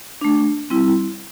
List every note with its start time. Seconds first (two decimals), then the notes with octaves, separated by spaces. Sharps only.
0.21 A3 D4
0.70 G3 C4 E4